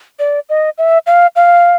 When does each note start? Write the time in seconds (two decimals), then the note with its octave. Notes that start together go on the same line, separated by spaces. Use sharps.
0.19 D5
0.49 D#5
0.78 E5
1.07 F5
1.36 F5